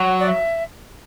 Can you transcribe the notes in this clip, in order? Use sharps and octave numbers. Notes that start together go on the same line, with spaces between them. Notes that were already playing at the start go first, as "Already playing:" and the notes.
Already playing: F#3 F#5
D5
E5